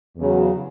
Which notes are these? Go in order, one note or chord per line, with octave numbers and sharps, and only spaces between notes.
E2 C#3 F#3